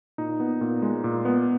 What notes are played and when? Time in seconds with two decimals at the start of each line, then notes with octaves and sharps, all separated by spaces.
0.18 A#2 D#4
0.40 B3
0.61 A#2
0.82 G#3
1.04 A#2
1.25 B3